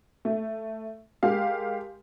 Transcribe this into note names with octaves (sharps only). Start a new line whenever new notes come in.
A3
G#3 G4 A#4 F5